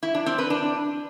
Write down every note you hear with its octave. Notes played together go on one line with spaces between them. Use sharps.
E4
D4
C4
B4
D4